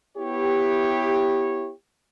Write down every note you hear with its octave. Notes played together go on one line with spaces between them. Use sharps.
B3 E4 G4 C#5